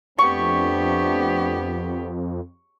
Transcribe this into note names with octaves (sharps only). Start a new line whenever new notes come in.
F2 A3 B3 C4 D4 G4 C#6